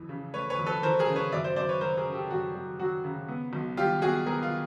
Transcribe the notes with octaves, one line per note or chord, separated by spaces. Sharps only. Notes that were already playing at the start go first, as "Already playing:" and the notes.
Already playing: F2 E3
C#3
A3 B4 C#5
B4 C#5
F2
A4 B4
E3 A#4 C5
G#4 A#4
C#3
B4 C#5
F#2 D5 E5
C5 D5
F#2 C5 D5
B4 C#5
F#3 A#4 C5
G#4 A#4
C#3
G4 A4
F#2 F#4
F#2
F#3 F#4
C#3
B3
B1
G3 F4 G4
B2 F#4 G#4
B3 G#4 A#4
F4